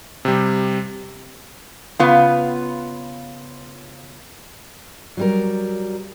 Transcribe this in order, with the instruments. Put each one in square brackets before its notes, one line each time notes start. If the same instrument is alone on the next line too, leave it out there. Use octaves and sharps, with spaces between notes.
[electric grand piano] C3 G3
[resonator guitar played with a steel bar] C#3 B3 F4
[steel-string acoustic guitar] F#3 G3 A#4